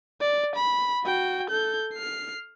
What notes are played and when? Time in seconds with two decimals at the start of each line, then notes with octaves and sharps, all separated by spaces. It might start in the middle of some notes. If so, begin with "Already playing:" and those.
0.21 D5
0.56 B5
1.04 F#4 G5
1.50 A4 G6
1.94 F6 C7